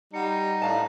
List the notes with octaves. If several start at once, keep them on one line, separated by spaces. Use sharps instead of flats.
G3 D#4 F#5 C#7
A2 D4 F5 A5